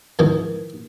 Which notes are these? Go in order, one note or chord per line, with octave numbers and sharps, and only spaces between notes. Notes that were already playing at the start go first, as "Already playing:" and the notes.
F2 G#2 D#3 E3